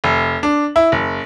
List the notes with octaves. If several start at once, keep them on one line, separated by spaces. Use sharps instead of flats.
F1
D4
E4
F#1